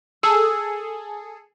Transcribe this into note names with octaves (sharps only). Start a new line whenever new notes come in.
G#4 A4 E6